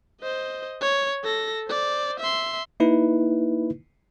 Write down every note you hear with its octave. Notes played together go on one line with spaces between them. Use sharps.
C5 D#5
C#5
A4 A#6
C5 D5
E5 C6
A#3 D#4 E4 B4